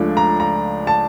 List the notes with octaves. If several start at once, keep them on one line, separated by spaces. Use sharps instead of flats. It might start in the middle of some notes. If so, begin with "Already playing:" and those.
Already playing: C#2 C#3 F3 A3 D4
A#5
A#5
A5